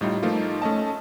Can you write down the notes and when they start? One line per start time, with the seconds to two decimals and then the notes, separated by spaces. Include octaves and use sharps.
0.01 A2 G3 D#4 F4
0.23 F3 A3 A#3 D#4 F4
0.62 A3 C#4 D#5 A5